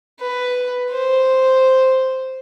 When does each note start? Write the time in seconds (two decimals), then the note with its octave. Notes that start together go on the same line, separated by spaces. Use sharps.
0.20 B4
0.91 C5